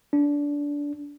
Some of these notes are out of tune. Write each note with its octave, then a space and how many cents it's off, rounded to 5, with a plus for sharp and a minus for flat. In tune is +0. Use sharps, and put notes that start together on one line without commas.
D4 -20